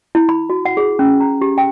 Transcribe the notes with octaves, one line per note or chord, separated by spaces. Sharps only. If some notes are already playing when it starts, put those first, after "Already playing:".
E4
B5
F#4
F#5
G#4
C#4
A#5
G4
G5